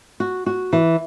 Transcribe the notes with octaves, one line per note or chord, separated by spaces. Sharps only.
F#4
F#4
E3